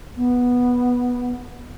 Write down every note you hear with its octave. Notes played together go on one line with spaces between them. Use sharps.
B3